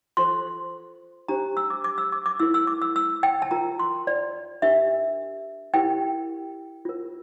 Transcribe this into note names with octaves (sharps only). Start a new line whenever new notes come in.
F4 A4 C5 C6
D4 G4 C5 A#5
E6
D6
D6
E6
D6
D6
E4 A#4 E6
E6
D6
E6
E6
G5
A5
F4 A#4 A#5
C6
D5
D4 G4 A#4 E5
E4 G4 A#4 G5
F4 A#4